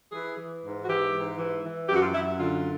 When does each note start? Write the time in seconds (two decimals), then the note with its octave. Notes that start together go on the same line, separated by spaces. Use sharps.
0.12 E3 G#4
0.37 E3
0.63 G#2
0.83 F#4
0.88 E3 G4
1.13 G#2
1.38 E3
1.64 E3
1.89 F#2 G4
1.95 F#4
2.01 F4
2.14 F#2 E4
2.39 D3 F4